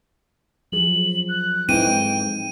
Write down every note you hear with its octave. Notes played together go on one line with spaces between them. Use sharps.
F3 F#3 G#4 F#7
F#6
F2 G#2 E3 C4 D#4 E4 G5 D#7